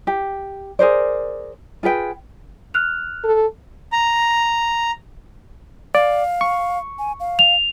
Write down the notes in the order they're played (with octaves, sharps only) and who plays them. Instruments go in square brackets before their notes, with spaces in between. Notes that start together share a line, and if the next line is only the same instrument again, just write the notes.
[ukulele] G4
G#4 A#4 C5 D5
F4 G#4 B4 G5
[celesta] F6 F#6 F7
[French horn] A4
[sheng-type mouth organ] A#5
[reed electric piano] D5 [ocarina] F5
[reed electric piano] C#6
[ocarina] G#5
F5
[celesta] F7